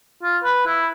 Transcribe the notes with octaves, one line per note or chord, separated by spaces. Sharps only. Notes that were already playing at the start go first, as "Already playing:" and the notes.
F4
B4
E4